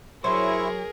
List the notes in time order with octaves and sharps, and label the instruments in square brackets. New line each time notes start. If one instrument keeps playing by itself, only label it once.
[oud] F#3 [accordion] E4 C#6 [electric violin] G#4 A#4 [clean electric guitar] C5